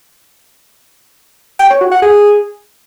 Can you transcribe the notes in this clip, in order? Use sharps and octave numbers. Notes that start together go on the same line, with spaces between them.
G5
C#5
F#4
F#5
G#4